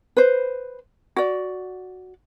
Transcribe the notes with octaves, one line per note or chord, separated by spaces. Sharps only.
B4 C5
F#4 D5